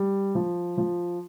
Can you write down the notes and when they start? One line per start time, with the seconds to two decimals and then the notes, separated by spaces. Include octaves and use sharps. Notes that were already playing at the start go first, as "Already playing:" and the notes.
Already playing: G3
0.35 F3
0.78 F3